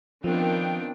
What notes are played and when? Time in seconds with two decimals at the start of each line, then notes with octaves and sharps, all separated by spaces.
0.24 D#3 F3 B3 C4 D4 F4 G5